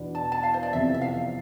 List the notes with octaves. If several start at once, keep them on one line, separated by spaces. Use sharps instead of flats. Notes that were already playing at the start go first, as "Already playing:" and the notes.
Already playing: E2 B2 B3 D4
A5
A5
F5
C5
D5
F2 C3 E3 B3 E5
E5
F5